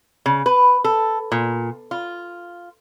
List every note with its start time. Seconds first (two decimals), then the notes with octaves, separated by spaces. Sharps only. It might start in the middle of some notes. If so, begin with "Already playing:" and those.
0.26 C#3
0.46 B4
0.84 A4
1.32 A#2
1.91 F4